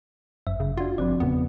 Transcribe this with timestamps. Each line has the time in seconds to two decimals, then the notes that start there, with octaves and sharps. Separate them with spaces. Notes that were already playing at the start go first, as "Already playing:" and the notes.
0.47 G1 F#2 E5
0.60 C#3
0.77 D4 F4 F#4
0.98 G1 F3 C4 D5
1.20 E2 G#2 C#3 B3